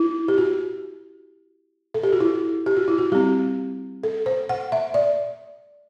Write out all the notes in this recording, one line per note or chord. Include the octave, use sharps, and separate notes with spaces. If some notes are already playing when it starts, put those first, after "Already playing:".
Already playing: E4
G4
F#4
A4
G4
F#4
E4
G4
F#4
E4
F#4
G3 C4 G4
A4
C5
F#5
E5
D5